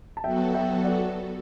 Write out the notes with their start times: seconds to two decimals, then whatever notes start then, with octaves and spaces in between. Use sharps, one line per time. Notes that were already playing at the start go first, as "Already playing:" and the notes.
0.17 A5
0.24 F#3 B3 F#4 A4 E5 G5
0.54 E5 G5
0.79 G5
0.84 D5 F#5